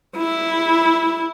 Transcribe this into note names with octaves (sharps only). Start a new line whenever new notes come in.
E4